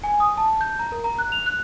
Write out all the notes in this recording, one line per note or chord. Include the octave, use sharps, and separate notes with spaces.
G#5
D#6
A5
G6
A#5
A#4
A#5
F#6
F7
F#6